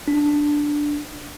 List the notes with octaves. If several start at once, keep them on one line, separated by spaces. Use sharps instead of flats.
D4